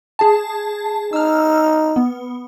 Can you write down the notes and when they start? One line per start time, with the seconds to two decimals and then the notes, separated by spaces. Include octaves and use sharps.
0.19 G#4 A5
1.13 D#4 E6 F6
1.96 B3